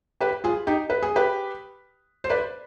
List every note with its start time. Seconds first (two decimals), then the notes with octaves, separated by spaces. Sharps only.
0.21 G4 B4
0.44 F4 G#4
0.67 D#4 G4
0.90 B4
1.02 G#4
1.16 G4 B4
2.24 C5
2.29 B4 D5